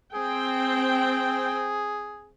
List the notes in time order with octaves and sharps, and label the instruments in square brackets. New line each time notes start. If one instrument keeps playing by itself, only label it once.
[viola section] C4 G5 [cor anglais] G#4